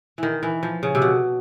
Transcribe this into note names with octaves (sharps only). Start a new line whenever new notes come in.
D#3 E3
E3
F3
C#3
C3
B2